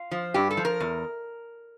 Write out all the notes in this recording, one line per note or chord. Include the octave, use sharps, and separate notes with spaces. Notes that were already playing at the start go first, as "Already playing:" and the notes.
Already playing: F4
F3
G2 G4
A4
F3
A#4
E2